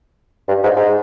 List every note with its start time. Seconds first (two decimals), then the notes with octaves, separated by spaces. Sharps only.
0.48 G2
0.63 G#2
0.76 G#2